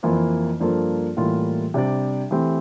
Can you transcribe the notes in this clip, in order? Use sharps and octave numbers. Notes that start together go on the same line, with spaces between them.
F2 E3 A#3 F4 C5
G2 F3 A#3 F4 A4
A2 E3 G3 A#3 F4
C3 G3 D4 G4 D5
E3 A3 C4 G4